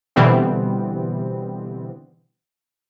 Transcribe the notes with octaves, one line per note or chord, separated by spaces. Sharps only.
B2 D3 E3 G3 B3 C4